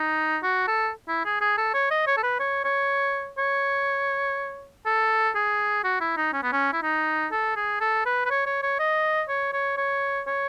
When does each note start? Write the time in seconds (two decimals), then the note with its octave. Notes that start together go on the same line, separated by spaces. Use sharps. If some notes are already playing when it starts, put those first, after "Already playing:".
Already playing: D#4
0.43 F#4
0.68 A4
1.08 E4
1.25 G#4
1.41 G#4
1.58 A4
1.74 C#5
1.91 D#5
2.07 C#5
2.17 A4
2.23 B4
2.40 C#5
2.64 C#5
3.38 C#5
4.86 A4
5.35 G#4
5.84 F#4
6.01 E4
6.17 D#4
6.33 C#4
6.43 B3
6.52 C#4
6.73 E4
6.82 D#4
7.32 A4
7.56 G#4
7.81 A4
8.06 B4
8.25 B4
8.30 C#5
8.46 C#5
8.62 C#5
8.79 D#5
9.29 C#5
9.53 C#5
9.77 C#5
10.27 C#5